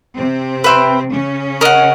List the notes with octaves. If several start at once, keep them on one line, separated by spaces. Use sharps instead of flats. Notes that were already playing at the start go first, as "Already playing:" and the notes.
C3 C4
B4 E5 G5 C6
C#3 C#4
A#4 D#5 F#5